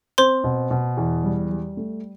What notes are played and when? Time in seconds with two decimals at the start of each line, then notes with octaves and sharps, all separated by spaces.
0.18 C4 C5 C6
0.44 B2
0.71 B2
0.97 E2
1.24 G3
1.51 G3
1.77 A3